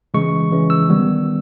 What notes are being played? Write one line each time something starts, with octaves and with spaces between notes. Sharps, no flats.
C#3 E3 G#3 C#4 C#6
C#3 E3 G#3 C#4
E6
D#3 G3 B3